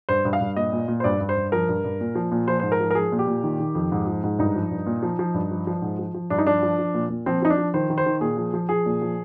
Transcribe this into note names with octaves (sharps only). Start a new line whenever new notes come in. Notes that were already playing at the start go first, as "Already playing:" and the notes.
G2 C5
G2
F5
G2
A#2 D#5
A#2
A#2
C5
G2 D5
G2
C5
G2
F3 A#4
G2
G2
A#2
F3
A#2
F3 C5
G#2 C5
A#4
F3
A#4
F3 G#4
A#2
G4
A#2
D#3
D#3
F2
G#2
F3
G#2
G2 D#4
F3
G2
A#2
F3
F3
G2
F3
F3
G#2
F3
F3
G2 D4
D#4
F3 D4
F3
F3
A#2
A#2
F3 C4
F3 D#4
D4
F3
D#3 C5
D#3
C5
D#3
A#2 G#4
F3
F3
F3 G#4
A#2
F3